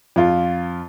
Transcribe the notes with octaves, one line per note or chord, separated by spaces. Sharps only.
F2 F4